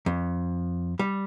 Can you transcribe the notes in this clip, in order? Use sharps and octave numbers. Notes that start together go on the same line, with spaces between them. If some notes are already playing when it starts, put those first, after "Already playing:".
F2
G3